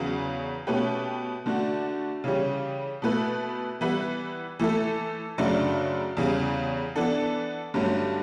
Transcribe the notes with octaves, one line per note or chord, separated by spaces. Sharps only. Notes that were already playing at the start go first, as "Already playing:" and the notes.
Already playing: E2 C#3 F#3 B3
B2 A3 C#4 G4 B4
D3 A3 D4 F#4
C#3 E3 G3 C#4 G4
B2 A3 E4 B4
E3 G3 B3 E4 B4
E3 A3 E4 A4
F#2 C#3 F#3 A3 D4
E2 C#3 G3
E3 B3 D4 A4
G2 D3 F#3 A3 C#4